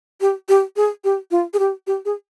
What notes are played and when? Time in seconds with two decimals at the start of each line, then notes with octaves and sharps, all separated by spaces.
0.21 G4
0.49 G4
0.76 G#4
1.04 G4
1.31 F4
1.54 G#4
1.59 G4
1.87 G4
2.05 G#4